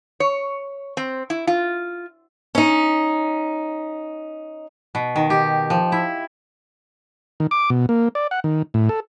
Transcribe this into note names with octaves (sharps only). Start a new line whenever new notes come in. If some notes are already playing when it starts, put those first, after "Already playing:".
C#5
C4
E4
F4
C#4 D#4
B2
D#3
G4
F3
E4
D#3
D6
B2
A#3
D5
F#5
D#3
A2
A4